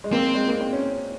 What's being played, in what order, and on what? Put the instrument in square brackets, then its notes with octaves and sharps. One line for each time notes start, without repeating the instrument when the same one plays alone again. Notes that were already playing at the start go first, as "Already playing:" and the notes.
[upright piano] G#3
[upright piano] A#3 [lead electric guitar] C4
[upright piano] G#3
A#3
C4
C#4